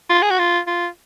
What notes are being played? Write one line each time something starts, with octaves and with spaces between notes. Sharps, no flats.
F4
G#4
F#4
F4
F4